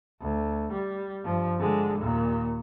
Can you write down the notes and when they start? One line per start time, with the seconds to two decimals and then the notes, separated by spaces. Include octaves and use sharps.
0.21 D2
0.73 G3
1.24 G2 F3
1.59 D3 G#3
1.98 D#2 A#2